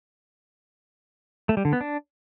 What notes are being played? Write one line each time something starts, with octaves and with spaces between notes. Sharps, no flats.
A3
G3
D3
B3
D4